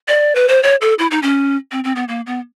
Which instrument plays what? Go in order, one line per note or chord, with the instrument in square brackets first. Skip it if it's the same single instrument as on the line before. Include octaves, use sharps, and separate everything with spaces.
[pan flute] D5
B4
C5
C#5
A4
E4
D#4
C#4
C4
C4
B3
A#3
B3